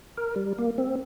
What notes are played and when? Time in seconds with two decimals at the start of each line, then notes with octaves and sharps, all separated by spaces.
0.17 A#4
0.36 G3
0.58 A#3
0.78 C4